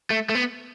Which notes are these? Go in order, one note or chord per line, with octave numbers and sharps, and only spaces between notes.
A3
A3
B3